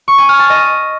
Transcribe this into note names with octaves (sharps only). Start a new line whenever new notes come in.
C#6
G#5
F6
A5
D#5